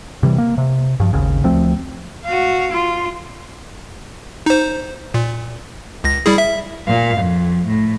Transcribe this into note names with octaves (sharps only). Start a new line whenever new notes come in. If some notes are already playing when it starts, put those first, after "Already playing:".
C3 E3 G3
A#3
C3
G2 F3
G#1 D#2 C#3
D2 F3 A3 C4
F#4 F5
F4
D#4 C5
A#2
C#2 A#6
G3 E4 G#4
E5
A#2 F5
F2
A2